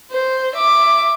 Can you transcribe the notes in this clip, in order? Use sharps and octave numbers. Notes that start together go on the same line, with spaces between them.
C5
E5 D6